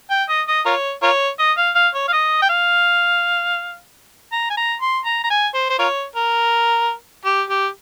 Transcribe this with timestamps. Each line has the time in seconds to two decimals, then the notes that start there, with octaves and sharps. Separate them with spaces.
0.11 G5
0.29 D#5
0.48 D#5
0.66 F4 A#4 C#5
1.03 F4 A#4 C#5
1.40 D#5
1.57 F5
1.75 F5
1.95 C#5
2.08 F5
2.13 D#5
2.42 G5
2.49 F5
4.33 A#5
4.50 G#5
4.57 A#5
4.82 C6
5.05 A#5
5.24 A#5
5.30 G#5
5.54 C5
5.70 C5
5.79 F4 A#4 C#5
6.16 A#4
7.25 G4
7.50 G4